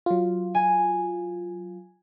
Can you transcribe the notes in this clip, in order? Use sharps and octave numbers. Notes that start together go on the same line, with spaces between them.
F#3 F4
G#5